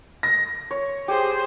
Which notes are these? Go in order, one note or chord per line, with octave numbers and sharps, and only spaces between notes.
A#6
C#5
G4 G#4 C5